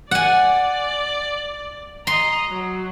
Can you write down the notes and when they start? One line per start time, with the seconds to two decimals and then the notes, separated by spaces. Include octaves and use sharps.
0.11 D5 F#5 G#5
2.07 D#5 A#5 C6
2.49 F#3